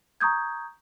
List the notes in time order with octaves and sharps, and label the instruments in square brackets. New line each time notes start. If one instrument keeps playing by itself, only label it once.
[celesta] A#5 C#6 D#6 G6 G#6